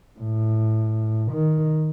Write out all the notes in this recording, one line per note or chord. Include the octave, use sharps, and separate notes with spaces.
A2
D#3